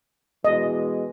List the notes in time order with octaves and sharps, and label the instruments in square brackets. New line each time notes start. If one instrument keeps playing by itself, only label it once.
[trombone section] B2 E3 G#3 [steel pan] D#5